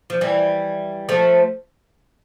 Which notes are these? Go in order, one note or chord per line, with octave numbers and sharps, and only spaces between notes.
F3
E3 G3
F3 A3